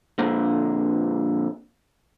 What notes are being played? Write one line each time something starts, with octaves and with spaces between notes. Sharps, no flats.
F2 A#2 D3